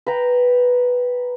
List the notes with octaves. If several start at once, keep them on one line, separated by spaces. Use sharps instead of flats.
B4 G5 A#5